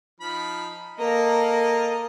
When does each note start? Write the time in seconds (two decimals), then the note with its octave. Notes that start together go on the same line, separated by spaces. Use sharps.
0.21 F3 D#4 B5
0.99 A#3 A4 D#5 A#5